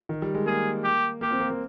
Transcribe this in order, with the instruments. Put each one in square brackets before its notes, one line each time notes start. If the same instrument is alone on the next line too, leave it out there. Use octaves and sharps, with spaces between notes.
[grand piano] D#3
G3
G#3
[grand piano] A#3 [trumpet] G#4
[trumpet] G4
[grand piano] A#3 [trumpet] G4
[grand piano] C4
A#3
A#3